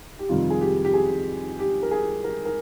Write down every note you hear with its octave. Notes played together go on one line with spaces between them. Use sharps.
G4
F2 C3 D#3 G3 F4
G#4
G4
G4
G#4
G4
A#4
G#4
A#4
A#4